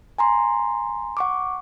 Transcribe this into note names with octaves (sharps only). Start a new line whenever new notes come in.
G#5 A#5 C6
F#5 C#6 D6